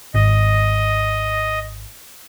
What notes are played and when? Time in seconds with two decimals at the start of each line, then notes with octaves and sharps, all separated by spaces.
0.14 G#1 D#5